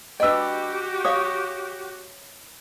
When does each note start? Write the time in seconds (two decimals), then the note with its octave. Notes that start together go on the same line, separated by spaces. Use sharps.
0.20 D4 F#4 G4 B4 D#5 G5 E6
1.05 C#5 F5 D#6